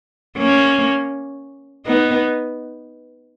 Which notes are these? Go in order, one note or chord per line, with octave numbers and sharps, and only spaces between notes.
A#3 C#4
B3 D#4